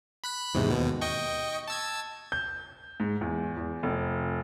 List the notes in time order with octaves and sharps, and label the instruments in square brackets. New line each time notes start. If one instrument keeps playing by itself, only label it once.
[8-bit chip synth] B5 F#6 B6
E2 G#2 C3
D#2 B2
D#5 G5 C#6
A5 E6 G#6
[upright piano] G6
G#2
E2
E2
F1